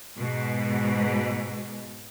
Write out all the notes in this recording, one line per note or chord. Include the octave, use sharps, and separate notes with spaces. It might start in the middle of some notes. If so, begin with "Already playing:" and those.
G#2 B2